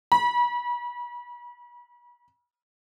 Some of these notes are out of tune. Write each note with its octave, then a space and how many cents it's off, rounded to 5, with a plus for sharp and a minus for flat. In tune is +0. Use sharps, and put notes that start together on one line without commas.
B5 -40